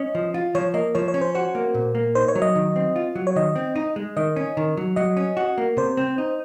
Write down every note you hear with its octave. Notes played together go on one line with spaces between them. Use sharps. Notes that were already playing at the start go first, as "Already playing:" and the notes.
Already playing: C#4 D#5
F3
F4
F3 C#5
A#3 D#5
F3 C#5
C#5
C#4
C5
F#4 C5
A#3
A#2
A#3
D#4 C5
C#5
F#3
D#5
D#3
C4
F4
F#3
C#5
D#3 D#5
C4
D#4
G#3
D#3 D#5
C#4
D#3
F#3
F#3 D#5
C#4
F#4
A#3
C3 C5
C4
D#4